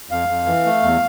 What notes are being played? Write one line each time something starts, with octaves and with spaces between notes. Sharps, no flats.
F2 F5
F2
E3
A3
E2